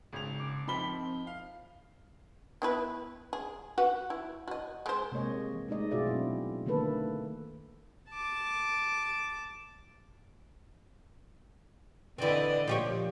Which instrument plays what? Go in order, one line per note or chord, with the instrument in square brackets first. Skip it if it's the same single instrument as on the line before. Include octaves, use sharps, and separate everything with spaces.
[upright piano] G#1 F7 [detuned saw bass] C#3
[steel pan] D6
[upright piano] F3 G7 [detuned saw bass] C4 [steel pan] D#4 B5
[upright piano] F5
[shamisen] B3 E4 B4
G#4
F#4 B4 F#5
E4
F#4 D#5
G#3 C5
[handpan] C3 G#3 A#3 G4 C#5 D#5
E3
G#3 A3 D#4 D5 D#5
B2 F4 F#4 G#4 D5 E5
F#3 C4 D4 E4
D3 D#3 A3 A#3 A4 B4
[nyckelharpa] A5 D6
[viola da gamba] D3 D5 D#5 [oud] E3 C4
[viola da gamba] A#2 [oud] F3 G4 C#5